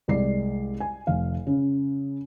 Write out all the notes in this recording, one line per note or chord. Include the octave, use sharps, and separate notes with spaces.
C2 G#3 D5 C7
G#5
F1 F5
C#3